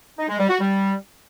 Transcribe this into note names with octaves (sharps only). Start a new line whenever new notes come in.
D#4
G#3
G3
F#4
G3